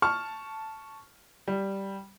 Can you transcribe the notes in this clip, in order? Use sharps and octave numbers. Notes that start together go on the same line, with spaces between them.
A5 C#6 F6
G3